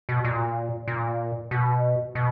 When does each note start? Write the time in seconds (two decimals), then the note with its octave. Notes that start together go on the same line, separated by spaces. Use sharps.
0.09 B2
0.25 A#2
0.88 A#2
1.51 B2
2.15 B2